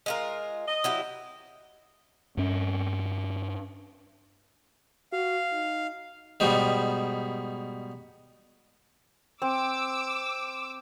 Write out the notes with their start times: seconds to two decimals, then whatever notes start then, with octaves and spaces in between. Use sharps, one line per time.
0.06 G#3 F4 A#4
0.68 D#5
0.84 F#3 E4 G4
2.37 G2 C#4
5.13 F#4 F5
5.52 D#4
6.40 G#2 B2 G3
9.42 C4 D6 E6